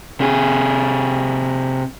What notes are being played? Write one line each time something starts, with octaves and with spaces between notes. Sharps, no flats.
C3 G#4